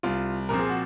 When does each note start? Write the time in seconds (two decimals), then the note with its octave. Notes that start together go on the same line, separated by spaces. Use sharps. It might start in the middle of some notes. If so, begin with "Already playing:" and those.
0.03 C2 F4
0.49 A#2 F3 C4 A#4
0.59 G#4
0.70 F#4